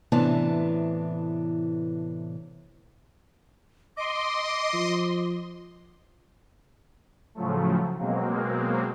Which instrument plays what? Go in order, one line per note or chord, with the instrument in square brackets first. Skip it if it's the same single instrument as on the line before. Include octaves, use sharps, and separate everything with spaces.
[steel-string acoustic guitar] A2 C3 E3 B3 D4 A5
[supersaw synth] D#5 C6 [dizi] D6
[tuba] F3
[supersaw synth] A2 C#3 F3 F#3 A3
B2 F#3 G#3 A#3 C4